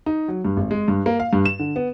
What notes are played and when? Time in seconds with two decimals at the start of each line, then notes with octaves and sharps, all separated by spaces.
0.06 D#4
0.28 F#3
0.45 G2
0.57 G#1
0.71 G#3
0.88 G2
1.06 A#3
1.20 F5
1.33 G2
1.45 E7
1.59 D3
1.76 B3